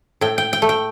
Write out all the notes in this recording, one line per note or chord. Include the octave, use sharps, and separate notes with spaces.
A2 G5
G5
G5
A3
G5